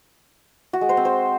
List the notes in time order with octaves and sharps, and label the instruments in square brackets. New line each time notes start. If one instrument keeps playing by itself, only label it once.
[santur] F#4
G#3
C5
C4
C5